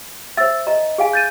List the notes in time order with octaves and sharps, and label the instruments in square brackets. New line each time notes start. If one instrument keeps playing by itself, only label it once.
[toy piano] C5 E5 [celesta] E6 A6
[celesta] D#5 [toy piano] A#5
[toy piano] G#4 F5 G#5
[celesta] G6 A6 D#7